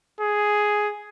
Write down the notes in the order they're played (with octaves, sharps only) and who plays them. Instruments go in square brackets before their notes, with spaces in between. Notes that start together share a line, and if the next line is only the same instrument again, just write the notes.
[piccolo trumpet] G#4